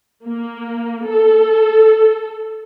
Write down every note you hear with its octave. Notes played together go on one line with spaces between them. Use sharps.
A#3
A4